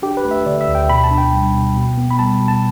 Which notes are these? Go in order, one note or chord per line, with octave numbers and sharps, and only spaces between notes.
D4 G4
B4
A3
E5
D3 D5
E5
D2
G5
B2 B5
A5
D4
G5
G3
B2
B2
B3
B5
G3 A5
B2
A5